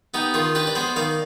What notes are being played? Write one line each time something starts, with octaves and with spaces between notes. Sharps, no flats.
B3 D#4 G4
D#3 F4 G#4
D4 G4 B4
D5
B3 G#4 C5
D#3 D5 F5